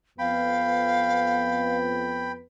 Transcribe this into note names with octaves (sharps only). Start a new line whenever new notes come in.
F2 B3 B4 F5 G5 B5